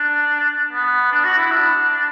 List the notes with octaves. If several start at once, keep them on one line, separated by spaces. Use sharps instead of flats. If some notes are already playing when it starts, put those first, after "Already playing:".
Already playing: D4
B3
D4
F#4
E4
D4